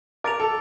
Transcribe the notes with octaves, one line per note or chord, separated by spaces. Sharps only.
A#4 D6 A6 D7 F7
A4